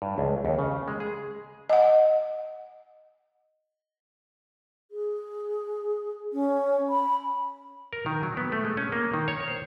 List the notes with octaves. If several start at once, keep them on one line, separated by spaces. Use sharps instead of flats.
G2
C#2
D#2
C#3
G#3
G#4
D#5 F#5
G#4
C#4
B5
A#4
D#3
F#3
B3
A3
G#3
C#4
A#3
D#3
C#5
C5